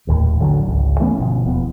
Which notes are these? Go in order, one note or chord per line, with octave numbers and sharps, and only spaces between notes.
D#1 D#2 A2
A1 D3 F#3
G#1 C#2
E3 A3 B3 C#4
G1 B2 F3
E1 E2 B3